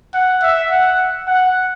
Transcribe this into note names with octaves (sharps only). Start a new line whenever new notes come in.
F#5
E5
F#5
F#5